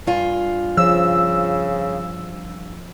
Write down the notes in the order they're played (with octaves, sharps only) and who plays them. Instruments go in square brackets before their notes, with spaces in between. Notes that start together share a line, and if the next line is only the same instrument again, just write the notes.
[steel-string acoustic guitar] G2 F4 G#5
[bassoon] C#3 [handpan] F3 [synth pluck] E6